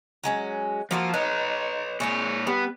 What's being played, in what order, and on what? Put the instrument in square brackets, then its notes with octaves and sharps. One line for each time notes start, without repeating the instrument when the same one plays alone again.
[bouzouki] F#3 G#3 C#4
[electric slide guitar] F3 [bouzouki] A#3 F#4 A4
[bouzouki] D#4 [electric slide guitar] B4 C#5
[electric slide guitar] A#2 C#5 [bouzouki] G#3 C5 A5
[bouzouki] G3 [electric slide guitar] B3